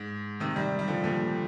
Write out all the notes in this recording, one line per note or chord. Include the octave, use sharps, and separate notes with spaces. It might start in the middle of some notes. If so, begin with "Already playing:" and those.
Already playing: G#2
C3 D#3
D#3 G3
G3
D3 F3
A#2 D3